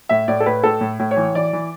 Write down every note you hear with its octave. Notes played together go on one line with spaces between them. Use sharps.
A2 E5
A2 D5
A4
A2 B4
A2 A4
A2
A2
C#5
E3
E3 D5
E3